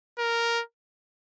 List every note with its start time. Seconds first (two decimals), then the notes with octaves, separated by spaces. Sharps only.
0.18 A#4